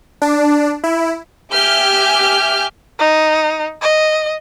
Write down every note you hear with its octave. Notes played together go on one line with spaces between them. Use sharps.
D4
E4
G4 E5 G#5 D6 F6 G6
D#4
D#5